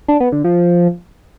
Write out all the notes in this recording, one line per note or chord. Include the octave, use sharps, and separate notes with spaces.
D4
B3
D3
F3